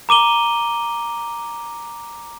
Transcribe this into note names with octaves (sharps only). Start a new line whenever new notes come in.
A#5 D6 D#7 G7